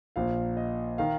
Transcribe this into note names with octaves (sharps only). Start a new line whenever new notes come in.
A#1 A#2 F5
D#5
D#3 F5